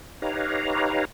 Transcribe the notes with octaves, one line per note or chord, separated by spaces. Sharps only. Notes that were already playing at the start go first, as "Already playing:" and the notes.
D#4 G4 B4 C#5 F5 A#5